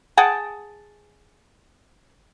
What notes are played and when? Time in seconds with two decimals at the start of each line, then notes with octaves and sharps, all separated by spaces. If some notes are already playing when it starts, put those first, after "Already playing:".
0.17 G#4 F#5 G5 A5